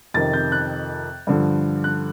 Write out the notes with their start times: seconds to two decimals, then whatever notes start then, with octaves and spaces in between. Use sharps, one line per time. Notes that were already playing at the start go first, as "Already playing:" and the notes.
0.14 F2 C3 D#3 A6
0.33 G6
0.52 F#6
1.27 G2 D3 F3
1.84 F#6